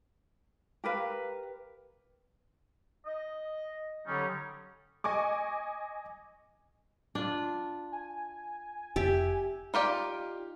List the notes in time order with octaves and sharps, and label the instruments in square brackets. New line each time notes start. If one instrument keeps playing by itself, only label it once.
[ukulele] G4 A#4 B4 F5
[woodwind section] D#5
D3 F#3 G3 C#4 D#4
[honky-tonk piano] D#5 G#5 C#6 D6
[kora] D4 F4
[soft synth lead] G#5
[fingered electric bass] F1 [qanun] G4 [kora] E5
[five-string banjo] D#4 F4 G4 D5